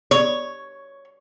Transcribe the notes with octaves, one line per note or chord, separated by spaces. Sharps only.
C#5